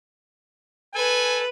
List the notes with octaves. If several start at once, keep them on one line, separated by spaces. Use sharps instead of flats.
A4 B4 G#5